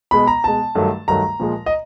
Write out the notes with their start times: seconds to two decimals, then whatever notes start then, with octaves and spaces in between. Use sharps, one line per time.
0.11 B2 G#3 B5
0.27 A#5
0.44 B2 G#3 A5
0.75 G2 D#3 F#3 A3
1.08 G2 D#3 F#3 A3 A#5
1.40 A#2 F3 G#3
1.66 D#5